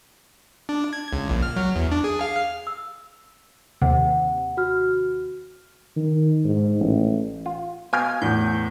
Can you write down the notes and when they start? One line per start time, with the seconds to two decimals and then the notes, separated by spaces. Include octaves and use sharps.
0.69 D4
0.93 G#6
1.13 C#2
1.30 A#1
1.43 F6
1.56 F#3
1.76 E2
1.91 D4
2.04 G#4
2.21 F5
2.67 E6
3.82 D#2 C3 F#5
4.57 F#4 F6
5.96 D#3
6.45 G#2
6.80 A1
7.46 F4
7.93 B2 F5 G5 G#5
8.22 E2 A2 G6